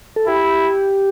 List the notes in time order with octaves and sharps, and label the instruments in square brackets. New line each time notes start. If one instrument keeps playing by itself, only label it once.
[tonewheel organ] A4
[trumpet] E4 [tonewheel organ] G4